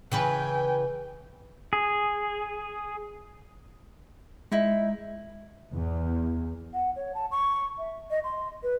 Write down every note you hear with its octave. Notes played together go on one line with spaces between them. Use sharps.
C#3 E3 B4 G5 G#5
G#4
G#3 D#4 E4
E2
F#5
C#5
A5
C#6
E5
D#5
C6
B4